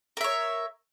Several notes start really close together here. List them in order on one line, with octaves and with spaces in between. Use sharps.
A#4 E5 C#5